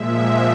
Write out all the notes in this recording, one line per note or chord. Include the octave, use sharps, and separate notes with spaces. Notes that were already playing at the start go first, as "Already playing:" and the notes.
Already playing: A#2 F3 G#3 E5